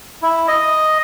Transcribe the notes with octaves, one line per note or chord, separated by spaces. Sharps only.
E4
D#5